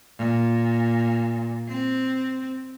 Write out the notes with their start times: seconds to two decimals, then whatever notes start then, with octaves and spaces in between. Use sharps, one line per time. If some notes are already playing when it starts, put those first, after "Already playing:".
0.18 A#2
1.69 C4